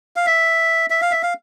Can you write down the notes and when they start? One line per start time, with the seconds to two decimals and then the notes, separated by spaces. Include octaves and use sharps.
0.16 F5
0.26 E5
0.90 E5
1.02 F5
1.11 E5
1.23 F5